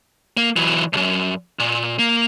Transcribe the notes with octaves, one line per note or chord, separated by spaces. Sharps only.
A#3
E3 F#3
B1 F#2
A#2
A#3